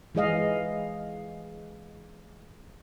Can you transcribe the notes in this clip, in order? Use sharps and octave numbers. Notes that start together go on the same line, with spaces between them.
E3 G#3 G#4 D#5 F5